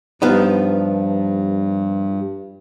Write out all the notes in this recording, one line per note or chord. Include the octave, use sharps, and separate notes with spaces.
G2 F3 B3 D#4